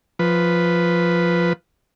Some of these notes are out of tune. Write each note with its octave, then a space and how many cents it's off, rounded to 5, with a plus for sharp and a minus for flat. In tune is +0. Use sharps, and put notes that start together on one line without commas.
F3 +0 B4 +0